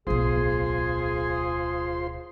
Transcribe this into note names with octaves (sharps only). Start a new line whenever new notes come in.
D1 B1 F4 G#4 C5 C6